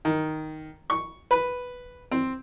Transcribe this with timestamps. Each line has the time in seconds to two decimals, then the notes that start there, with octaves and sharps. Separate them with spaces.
0.05 D#3
0.90 C#6
1.31 B4
2.12 C4